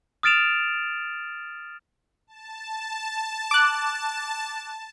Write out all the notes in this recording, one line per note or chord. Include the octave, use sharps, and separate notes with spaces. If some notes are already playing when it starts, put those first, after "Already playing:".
D#6 F6 A6 D7 E7 F7
A5
D6 F#6